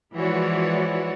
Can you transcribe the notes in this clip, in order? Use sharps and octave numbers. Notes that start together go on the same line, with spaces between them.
E3 F3 G#3 F#4 C#5 D5